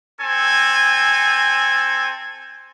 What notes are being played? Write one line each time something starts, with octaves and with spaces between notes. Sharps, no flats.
C4 A4 G#5